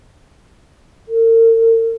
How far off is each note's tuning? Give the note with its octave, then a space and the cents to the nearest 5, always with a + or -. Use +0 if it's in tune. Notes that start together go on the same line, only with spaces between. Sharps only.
A#4 -45